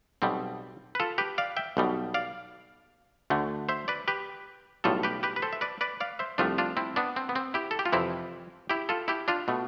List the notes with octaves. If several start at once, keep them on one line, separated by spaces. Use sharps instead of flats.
B1 B2 G3 C4
B4
F4 A4
G4 B4
D5 F5
E5 G5
B1 B2 G3
D5 F5
D2 D3 A3
C5 E5
B4 D5
G4 B4
B1 A2 G3 F4 A4
G4 B4
G4 B4
B4
A4 C5
E5
B4 D5
B4 D5
D5 F5
C5 E5
C2 C3 F3 A3 D4 F4
D4 F4
C4 E4
B3 D4
C4
B3
C4
E4 G4
A4
G4
F4
F2 C3 E3 C4 E4
E4 G4
F4 A4
E4 G4
D4 F4
B2 A3